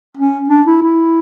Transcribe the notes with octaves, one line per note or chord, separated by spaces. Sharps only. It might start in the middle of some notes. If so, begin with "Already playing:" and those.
C#4
D4
E4
E4